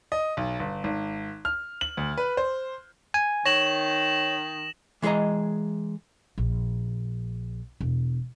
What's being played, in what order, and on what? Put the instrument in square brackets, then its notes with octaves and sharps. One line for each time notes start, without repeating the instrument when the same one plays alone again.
[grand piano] D#5
B1
G1
G#1
F6
F#7
D2
B4
C5
[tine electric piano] G#5
[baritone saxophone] D#3 [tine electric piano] C#5 [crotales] A#6 E7 F#7
[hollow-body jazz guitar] E3 G#3 G#4 C#5 D#5 A#5
[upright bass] A#1
E1